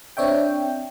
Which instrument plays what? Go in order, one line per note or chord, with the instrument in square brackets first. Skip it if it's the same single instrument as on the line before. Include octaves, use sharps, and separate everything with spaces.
[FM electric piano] C4 D4 C#5 E5 G5